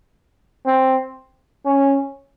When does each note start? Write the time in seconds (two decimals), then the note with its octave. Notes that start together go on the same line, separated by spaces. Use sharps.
0.66 C4
1.65 C#4